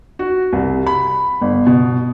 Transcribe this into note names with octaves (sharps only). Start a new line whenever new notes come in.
F#4
C2
B5
G1
B2